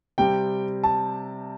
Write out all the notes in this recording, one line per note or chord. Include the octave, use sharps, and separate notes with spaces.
C3 G3 C4 G5
A5